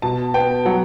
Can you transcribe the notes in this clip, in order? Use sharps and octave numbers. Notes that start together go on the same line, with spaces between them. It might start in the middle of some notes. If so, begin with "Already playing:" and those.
B2 A5
B3 G5
F#3 F#5